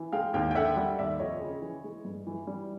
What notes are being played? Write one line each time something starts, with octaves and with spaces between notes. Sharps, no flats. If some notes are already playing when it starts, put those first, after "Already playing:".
Already playing: E3
G#3 F5 G5
D#2 F5 G5
G5
D3 E5 F#5
G3
D#2 D5 E5
F2 C#5 D#5
C#3
E3
G#3
G2
E3
G3